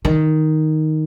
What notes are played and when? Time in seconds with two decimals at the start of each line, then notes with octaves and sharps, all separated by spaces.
0.05 D#3